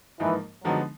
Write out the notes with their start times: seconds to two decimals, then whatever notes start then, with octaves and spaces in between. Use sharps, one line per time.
0.20 G#2 E3 F3 A#3 D#4
0.64 D3 F3 F#3 G#3 B3 D#4